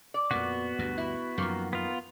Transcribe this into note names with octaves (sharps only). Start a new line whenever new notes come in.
D5
F2 A#2 B3 F#4
D2 G2
E4
F#2 D#3 F3 A#3
B3 F4